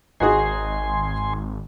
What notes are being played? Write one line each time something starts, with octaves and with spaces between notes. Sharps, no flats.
G#1 D#4 F#4 G#4 G#5 C6